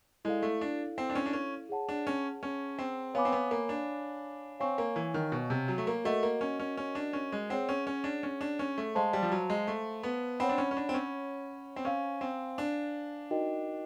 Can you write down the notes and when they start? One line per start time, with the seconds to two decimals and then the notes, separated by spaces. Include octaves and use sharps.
0.25 G#3 E4 A4 D5 F5
0.42 A3
0.61 D4
0.98 C4
1.10 D4
1.15 C#4
1.26 D4
1.33 C#4
1.69 G#4 C#5 F#5 A5
1.89 D4
2.07 C#4
2.43 C#4
2.79 C4
3.14 B3 C#5 F5 G#5 B5 D6
3.25 C4
3.32 B3
3.51 A#3
3.69 D4
4.60 C4 C#5 F5 G#5 C#6
4.78 A#3
4.96 E3
5.14 D#3
5.32 B2
5.50 C3
5.68 F#3
5.78 A3
5.87 A#3
6.04 A3 F#4 A#4 D#5 F#5
6.23 A#3
6.41 C#4
6.60 C#4
6.77 C#4
6.95 D4
7.13 C#4
7.32 G#3
7.50 C4 G#4 C#5 F#5
7.69 C#4
7.87 C#4
8.04 D4
8.23 C#4
8.41 D4
8.59 C#4
8.78 A3
8.95 G#3 C5 F5 A5 C6
9.13 G3
9.23 F3
9.32 F#3
9.50 G#3
9.67 A3
10.03 B3
10.40 C4 C#5 F#5 B5
10.49 D4
10.58 C#4
10.71 C#4
10.77 D4
10.89 C4
10.94 C#4
11.76 C4
11.85 C#4 C5 F5 G#5
12.21 C4
12.58 D4
13.31 D#4 F#4 A#4 D#5 G5